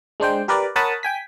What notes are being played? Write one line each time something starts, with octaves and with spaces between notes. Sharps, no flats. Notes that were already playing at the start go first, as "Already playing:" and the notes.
G#3 D4 C5 G5
G4 A#4 B4 D5
A#4 C#5 F#5 A5 B5 D#6
G5 G#5 B6